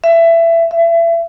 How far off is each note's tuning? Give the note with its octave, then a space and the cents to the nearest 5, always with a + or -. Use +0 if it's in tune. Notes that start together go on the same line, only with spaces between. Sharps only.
E5 +20
E5 +30